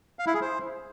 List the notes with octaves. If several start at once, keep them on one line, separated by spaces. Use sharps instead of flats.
F5
E4
G#4
C5